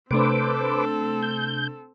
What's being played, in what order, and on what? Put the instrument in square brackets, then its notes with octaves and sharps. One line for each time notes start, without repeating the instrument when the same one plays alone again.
[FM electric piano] C3 A3 D4 [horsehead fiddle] C4 A4 [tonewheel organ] B4 C5 D6
[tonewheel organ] G6